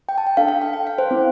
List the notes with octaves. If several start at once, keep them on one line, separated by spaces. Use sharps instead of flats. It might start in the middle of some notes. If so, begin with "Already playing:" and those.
G5
A5
G5
D4 A4 F5
F5
G5
G5
F5
C5
C4 E4 A4